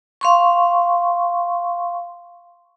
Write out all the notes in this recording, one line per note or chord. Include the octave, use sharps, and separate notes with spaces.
F5 C6 C#6